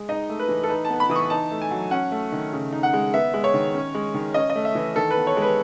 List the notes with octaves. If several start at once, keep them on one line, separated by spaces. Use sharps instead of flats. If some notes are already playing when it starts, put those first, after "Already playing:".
Already playing: G#3
D#4 D#5
A3
B4
E3
A4
D#4 B4
A5
B3
B5
E3 D#6
C#6
D#4 A5
A3
G#5
F#3
C#4 F#5
A3
D#3
C#3
D#4
F#5
G#3
B3 E5
G#3
C#5
D#3
C#4
G#3
D#3
C#4 D#5
D#5
A3
E5
E3
D#3 A4
B4
B3
C#5
G#3
B4